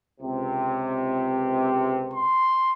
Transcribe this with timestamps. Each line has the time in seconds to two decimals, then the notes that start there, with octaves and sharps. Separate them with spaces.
0.21 C#2 C3
2.13 C6